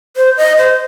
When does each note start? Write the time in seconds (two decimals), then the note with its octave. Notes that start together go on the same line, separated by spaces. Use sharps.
0.16 C5
0.37 D#5
0.58 C5